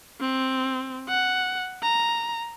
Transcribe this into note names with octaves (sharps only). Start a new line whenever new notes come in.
C4
F#5
A#5